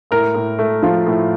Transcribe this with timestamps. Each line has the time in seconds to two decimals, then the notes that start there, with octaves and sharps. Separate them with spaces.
0.11 A2 A#4
0.34 A2
0.59 A3
0.82 F3 F4
1.06 A2